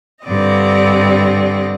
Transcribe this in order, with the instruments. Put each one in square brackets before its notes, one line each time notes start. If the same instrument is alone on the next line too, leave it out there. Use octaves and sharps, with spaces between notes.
[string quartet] G2 D3 C4 D5 D#5